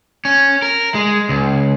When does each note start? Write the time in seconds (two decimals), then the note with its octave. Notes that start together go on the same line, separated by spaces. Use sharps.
0.25 C#4
0.62 A#4
0.95 G#3
1.29 C#2